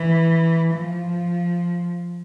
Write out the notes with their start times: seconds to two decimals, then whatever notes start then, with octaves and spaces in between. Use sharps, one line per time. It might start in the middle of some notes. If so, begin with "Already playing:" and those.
Already playing: E3
0.73 F3